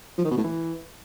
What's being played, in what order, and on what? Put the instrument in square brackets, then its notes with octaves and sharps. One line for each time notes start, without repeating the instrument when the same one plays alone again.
[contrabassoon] F3
D#3
B2
A2
E3